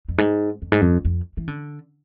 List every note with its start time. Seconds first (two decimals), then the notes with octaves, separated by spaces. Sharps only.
0.08 F2
0.18 G#2
0.62 F2
0.72 G#2
0.82 F2
1.05 F2
1.37 E3
1.48 D3